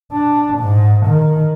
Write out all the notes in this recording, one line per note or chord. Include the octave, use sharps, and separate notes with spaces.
D4
G#2
D#3